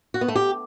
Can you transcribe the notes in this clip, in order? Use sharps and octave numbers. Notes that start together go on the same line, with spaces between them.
F#4
B3
A3
G4